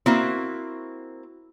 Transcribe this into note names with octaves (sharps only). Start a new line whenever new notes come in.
A#3 C4 E4 F#4 E5